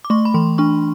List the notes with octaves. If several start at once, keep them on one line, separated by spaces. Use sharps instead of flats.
D6
A3 C#6
B5
E3 C6
D4 C#6